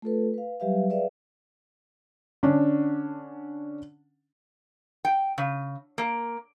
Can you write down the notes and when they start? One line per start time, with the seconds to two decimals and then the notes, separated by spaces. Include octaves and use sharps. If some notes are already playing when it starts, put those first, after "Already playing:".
0.02 A3 F4 A4 B4
0.34 B4 F5
0.60 F#3 G3 G4 B4 E5 F5
0.90 G#4 B4 D5 E5 F5
2.43 D3 C#4 D4
5.05 G5
5.38 C#3
5.98 A#3